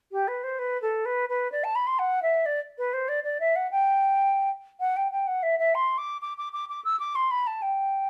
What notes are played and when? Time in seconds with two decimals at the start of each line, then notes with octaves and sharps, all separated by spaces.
0.12 G4
0.27 B4
0.43 C5
0.58 B4
0.81 A4
1.05 B4
1.29 B4
1.51 D5
1.63 A5
1.75 B5
1.87 C6
1.98 F#5
2.22 E5
2.45 D5
2.78 B4
2.93 C5
3.08 D5
3.23 D5
3.40 E5
3.55 F#5
3.71 G5
4.80 F#5
4.96 G5
5.12 G5
5.27 F#5
5.42 E5
5.59 E5
5.74 C6
5.97 D6
6.21 D6
6.37 D6
6.52 D6
6.69 D6
6.84 E6
6.99 D6
7.15 C6
7.30 B5
7.46 A5
7.62 G5